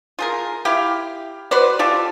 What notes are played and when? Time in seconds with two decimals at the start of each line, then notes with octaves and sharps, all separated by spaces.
0.19 F4 G#4 A#4
0.65 E4 G4 F5 G5
1.51 F#4 B4 C5 D5
1.79 F4 G4 A4